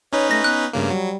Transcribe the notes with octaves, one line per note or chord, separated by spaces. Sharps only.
C#4 D#4 B4 C#5
A3 A#6
B3 F#6
G2 C#3 A3 A#3
F#3 G3